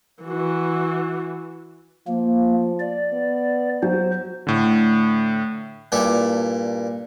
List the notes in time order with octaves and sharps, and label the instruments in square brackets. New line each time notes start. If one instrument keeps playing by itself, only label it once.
[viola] E3 F#4
[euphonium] F3 [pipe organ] A#3
[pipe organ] D5
[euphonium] B3
[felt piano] F#3 [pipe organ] C5
[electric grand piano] A2 D3
[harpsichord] G2 A#2 E4 A4 D5